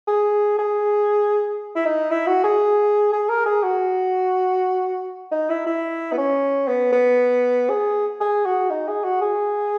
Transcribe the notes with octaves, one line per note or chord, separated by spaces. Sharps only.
G#4
G#4
E4
D#4
E4
F#4
G#4
G#4
A#4
G#4
F#4
D#4
E4
E4
B3
C#4
B3
B3
G#4
G#4
F#4
D#4
G#4
F#4
G#4